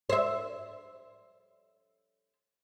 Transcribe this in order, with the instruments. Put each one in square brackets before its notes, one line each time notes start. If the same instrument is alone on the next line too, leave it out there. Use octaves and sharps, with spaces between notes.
[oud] C5 E5